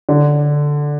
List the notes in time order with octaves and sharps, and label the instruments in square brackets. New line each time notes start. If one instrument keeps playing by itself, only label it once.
[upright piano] D3